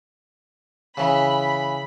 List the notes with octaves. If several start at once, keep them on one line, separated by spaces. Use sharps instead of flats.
C#3 E3 B5